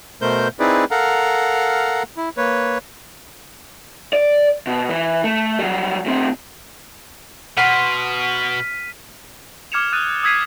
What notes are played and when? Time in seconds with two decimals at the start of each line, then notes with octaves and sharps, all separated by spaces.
0.22 B2 A3 A#4 C5 G6
0.60 C4 D#4 E4 G#4 B4 D5
0.91 A4 A#4 F5 F#5 A#5
2.17 E4
2.37 A#3 B4 C#5
4.13 D5
4.67 B2
4.89 E3
5.24 A3
5.59 F#3 G3
6.06 A2 C4
7.57 B2 F#5 C6 F6 B6 D#7
9.72 D6 F6 G#6 C#7 E7 F7
9.92 D#6 F#6 A6 D#7
10.23 D#6 E6 G#6 B6 C7 D#7